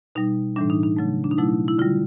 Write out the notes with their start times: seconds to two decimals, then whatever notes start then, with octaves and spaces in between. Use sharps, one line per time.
0.15 B2 G3 D#4
0.56 A2 E3 G3 D4
0.70 D#4
0.83 D#4
0.96 C#3 F#3 A3
1.24 D4
1.31 D#4
1.38 B2 F#3 A3 E4
1.68 E4
1.78 D3 G3 F4